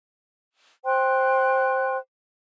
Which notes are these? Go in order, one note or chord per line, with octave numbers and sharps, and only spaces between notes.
C5 G5 C6 F#6